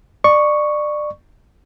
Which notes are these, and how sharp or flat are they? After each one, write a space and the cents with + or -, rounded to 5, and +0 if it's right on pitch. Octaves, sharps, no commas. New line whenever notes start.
D5 +25 C#6 +0